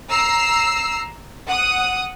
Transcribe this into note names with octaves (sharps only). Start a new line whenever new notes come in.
A#5 E6 C7
F#5 D#6